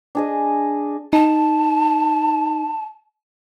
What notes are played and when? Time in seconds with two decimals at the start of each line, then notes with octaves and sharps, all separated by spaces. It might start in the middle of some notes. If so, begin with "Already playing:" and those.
0.15 D4 G#4 D#5
1.13 D#4 A5